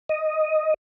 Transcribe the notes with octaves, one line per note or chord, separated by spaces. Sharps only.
D#5